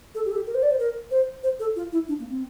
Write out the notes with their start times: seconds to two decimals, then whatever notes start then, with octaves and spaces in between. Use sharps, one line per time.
0.15 A4
0.25 G4
0.31 A4
0.36 G4
0.47 A#4
0.55 C5
0.63 D5
0.71 C5
0.79 A#4
1.11 C5
1.43 C5
1.60 A4
1.76 F4
1.92 E4
2.08 D4
2.20 A#3
2.30 C4